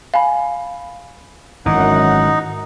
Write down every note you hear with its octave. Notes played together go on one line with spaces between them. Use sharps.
F5 G#5 B5
G#1 F#2 E3 D#4 F#5